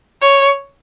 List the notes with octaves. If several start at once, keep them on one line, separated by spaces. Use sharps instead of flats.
C#5